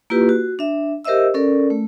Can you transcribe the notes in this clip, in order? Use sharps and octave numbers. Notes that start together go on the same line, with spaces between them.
A#3 E4 F4 G4 B4
F#4
D4 E5
G4 A#4 C5 D#5 E5 E6
C#4 A4 A#4 D5
A3